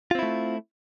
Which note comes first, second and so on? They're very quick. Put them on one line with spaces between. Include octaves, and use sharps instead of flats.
F4 C4 E4 A3